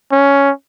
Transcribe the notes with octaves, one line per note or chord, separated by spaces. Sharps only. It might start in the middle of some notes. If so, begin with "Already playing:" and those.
C#4